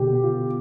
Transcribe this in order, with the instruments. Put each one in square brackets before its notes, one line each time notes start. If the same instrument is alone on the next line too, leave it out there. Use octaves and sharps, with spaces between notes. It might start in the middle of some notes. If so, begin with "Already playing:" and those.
Already playing: [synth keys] B2 D3 [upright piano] G4
[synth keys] B3
F4
B2